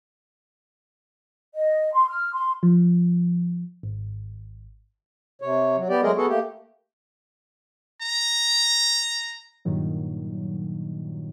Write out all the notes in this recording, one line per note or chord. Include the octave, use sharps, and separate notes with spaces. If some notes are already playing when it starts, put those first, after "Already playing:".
D#5
C6
F6
C6
F3
G#1
C3 C#5
F#3
B3 G4 D5
F#3 G#3 A3 G#4 A#4 D#5
B3 F#4 G#4 A4
A3 A#3 G4
A#5
G2 A#2 D#3 F#3